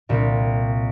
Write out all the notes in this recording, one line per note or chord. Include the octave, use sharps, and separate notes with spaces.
C2 A#2 G3